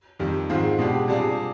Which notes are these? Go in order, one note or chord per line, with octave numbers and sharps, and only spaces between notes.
F2 D#3 G3
G#2 D#3 G#3 C4 F4
B2 G#3 D4 G4
C3 G3 D4 F4 G#4